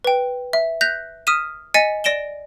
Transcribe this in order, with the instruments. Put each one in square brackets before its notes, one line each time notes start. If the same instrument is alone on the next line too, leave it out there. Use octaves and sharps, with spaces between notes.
[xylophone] B4 G5
E5
F#6 G6 A#6 B6 F7
D#6 F6 B6 D#7 E7
D#5 G#5 A6 B6 C#7 D#7
D5 A#6 D7 E7 G7